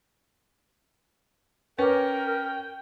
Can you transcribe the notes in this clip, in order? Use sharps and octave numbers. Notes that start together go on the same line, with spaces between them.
C#4 A#4 B4 G5 C#6 D6